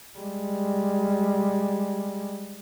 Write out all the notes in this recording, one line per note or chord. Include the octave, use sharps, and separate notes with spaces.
G3 G#3